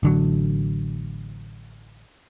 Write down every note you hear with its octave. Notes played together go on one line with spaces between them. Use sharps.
A1 D3 F#3